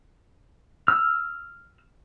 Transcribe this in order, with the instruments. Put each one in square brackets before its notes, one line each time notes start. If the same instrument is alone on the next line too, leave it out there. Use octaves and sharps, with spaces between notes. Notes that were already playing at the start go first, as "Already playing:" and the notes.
[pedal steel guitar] E6 F6